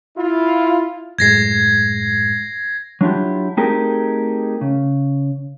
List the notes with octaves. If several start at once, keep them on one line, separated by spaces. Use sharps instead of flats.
E4 F4
F#2 A2 G#3 G#6 A#6 C7
F#3 D4 E4 F4 G4
A3 C4 D#4 G4 G#4 A#4
C#3